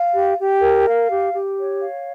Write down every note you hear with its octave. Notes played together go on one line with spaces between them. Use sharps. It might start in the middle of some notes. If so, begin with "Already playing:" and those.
Already playing: F5
G4
G4
A#4
F5
G4
G4
C#5
F5